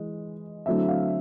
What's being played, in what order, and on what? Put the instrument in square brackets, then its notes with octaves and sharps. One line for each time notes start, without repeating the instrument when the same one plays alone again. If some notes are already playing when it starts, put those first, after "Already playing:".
Already playing: [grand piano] E3 G#3 D#5
D3 F#3 A3 C4 E4 E5
F5